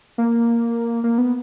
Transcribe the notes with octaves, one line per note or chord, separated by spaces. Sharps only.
A#3
A#3
B3